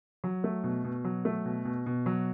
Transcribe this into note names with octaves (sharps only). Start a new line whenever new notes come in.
F#3
A3
B2
B2
F#3
A3
B2
B2
B2
F#3